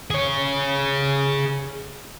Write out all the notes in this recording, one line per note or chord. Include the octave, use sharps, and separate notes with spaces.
G#4 C#5